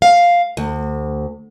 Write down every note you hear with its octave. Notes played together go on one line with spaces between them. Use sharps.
F5
D2